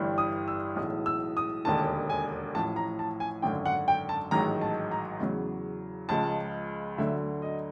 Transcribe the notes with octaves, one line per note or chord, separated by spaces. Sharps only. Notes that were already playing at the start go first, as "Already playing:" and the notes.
Already playing: G1 G2 E3 G3
D#6
E6
B1 A2 E3 G#3 D#6
E6
D#6
E1 D#2 D3 A5
G#5
A1 A2 F3 A5
A#5
A5
G#5
G#1 F#2 D3 G5
F#5
G5
A5
A1 G#2 D#3 F#3 A#5
A5
A#5
E2 C#3 F#3
C#2 C#3 F3 G#3 A5
D2 D3 F#3 E5
D#5